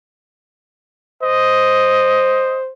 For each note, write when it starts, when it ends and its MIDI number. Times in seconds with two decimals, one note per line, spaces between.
1.23 2.72 72
1.23 2.59 75